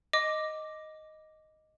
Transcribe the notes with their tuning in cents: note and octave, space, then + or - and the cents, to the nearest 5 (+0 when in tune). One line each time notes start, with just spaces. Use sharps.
D#5 +0 D6 +0